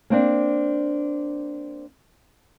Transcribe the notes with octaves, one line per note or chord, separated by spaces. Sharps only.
A#3 C4 D4